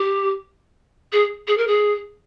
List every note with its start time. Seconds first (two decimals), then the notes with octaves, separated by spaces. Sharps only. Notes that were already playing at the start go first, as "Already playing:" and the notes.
Already playing: G4
1.12 G#4
1.48 G#4
1.58 A#4
1.67 G#4